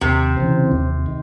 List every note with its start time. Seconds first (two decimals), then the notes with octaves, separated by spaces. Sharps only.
0.01 D#2 C3
0.37 C#3 E3 C4
0.72 D#2
1.06 D#3